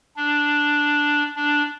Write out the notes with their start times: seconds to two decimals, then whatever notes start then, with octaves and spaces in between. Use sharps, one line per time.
0.17 D4
1.36 D4